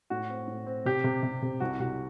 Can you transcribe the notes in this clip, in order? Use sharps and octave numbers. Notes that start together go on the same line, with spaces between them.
A2 F#4
C4
A2
C4
C3 G4
C3
C3
C3
C2 F#4
C2 F#4